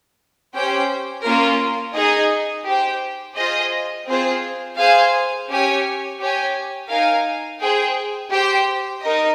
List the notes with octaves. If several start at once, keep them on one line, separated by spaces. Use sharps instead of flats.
C#4 G4 C5 G5
A#3 C#4 F4 A#4
D#4 G#4 D#5 G#5
G4 C5 G5
F4 G#4 C5 D#5
C4 F4 G#4 C5
G#4 C5 F5 G#5
C#4 G4 C#5 G#5
G4 C#5 G#5
D#4 A#4 F5 G#5
G#4 C5 G5
G4 C5 G5
D#4 A#4 D#5